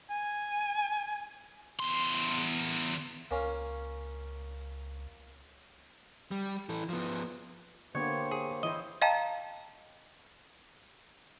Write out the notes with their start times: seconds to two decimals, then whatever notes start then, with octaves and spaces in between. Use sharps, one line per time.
0.10 G#5
1.79 E2 C6
3.31 C#2 A#3 C#4 F4
6.31 G3
6.69 E3 A4
6.89 F3 B3
7.95 D3 A#3 B3 G4 C5 C#5
8.31 G#4
8.63 E3 E4 C5 D#5
9.02 D#5 F5 G5 A5 A#5